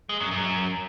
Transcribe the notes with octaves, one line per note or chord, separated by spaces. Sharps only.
G#3
F#2
F#2